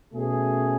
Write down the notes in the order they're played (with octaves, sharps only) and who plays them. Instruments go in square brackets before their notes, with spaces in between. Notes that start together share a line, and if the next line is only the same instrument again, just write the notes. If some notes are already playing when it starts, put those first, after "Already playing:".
[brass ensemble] B2 A3 C#4 G#4